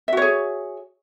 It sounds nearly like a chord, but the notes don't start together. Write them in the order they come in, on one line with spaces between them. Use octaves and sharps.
E5 F#4 C#5 G#4